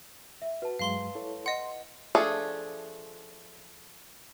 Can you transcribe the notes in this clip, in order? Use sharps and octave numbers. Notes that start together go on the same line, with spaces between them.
E5
F#4 B4 A5
G2 F#3 G#3 F5 C6 G7
E4 A4 C#5
D#5 F#5 C6
F3 A3 D4 G#4 A4